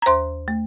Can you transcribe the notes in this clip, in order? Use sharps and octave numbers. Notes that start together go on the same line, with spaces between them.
A#5
D#2 C5 C6
A3